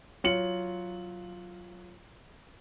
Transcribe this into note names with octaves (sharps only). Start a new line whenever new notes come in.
F#3 F4 C#7 F#7